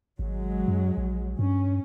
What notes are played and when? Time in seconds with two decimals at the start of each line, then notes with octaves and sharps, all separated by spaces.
0.19 G#1 F#3 G#3
0.68 F#2
0.97 A#1
1.39 G2 C#4